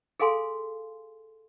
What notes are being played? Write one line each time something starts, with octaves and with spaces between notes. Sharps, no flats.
G#4 A4 F5 G#5 C6